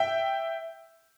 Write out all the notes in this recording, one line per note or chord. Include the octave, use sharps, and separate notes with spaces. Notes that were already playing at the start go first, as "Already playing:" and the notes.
Already playing: E5 G5